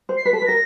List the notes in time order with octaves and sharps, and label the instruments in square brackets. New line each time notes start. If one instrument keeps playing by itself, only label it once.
[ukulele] C5
[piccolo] C7
[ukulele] B4 [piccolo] B6
[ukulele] A4
[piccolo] B6
[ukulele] B4
[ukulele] A#4 [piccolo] A#6